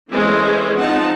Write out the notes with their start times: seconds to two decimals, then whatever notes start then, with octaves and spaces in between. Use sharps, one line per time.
0.12 E3 G#3 A3 C#4 E4 C5
0.79 F3 C4 D#4 F#5 A5